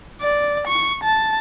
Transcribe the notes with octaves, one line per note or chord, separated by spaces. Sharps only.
D5
C#6
A5